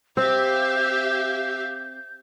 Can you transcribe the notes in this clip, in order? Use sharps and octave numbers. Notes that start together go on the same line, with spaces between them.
C4 G4 E5 F5 G6